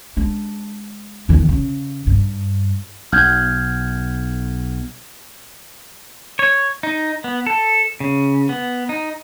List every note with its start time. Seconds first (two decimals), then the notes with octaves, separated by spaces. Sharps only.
0.17 G#3 D4
1.29 E2 D#3
1.49 C#3
2.07 G2
3.12 B1 F6 G6 G#6
6.39 C#5
6.83 D#4
7.24 B3
7.47 A4
8.00 C#3
8.49 B3
8.89 D#4